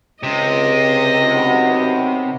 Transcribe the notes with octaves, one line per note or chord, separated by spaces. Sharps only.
C#2 C3 D#5
D#3 F#3 B3